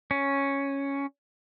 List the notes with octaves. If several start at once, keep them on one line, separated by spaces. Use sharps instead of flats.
C#4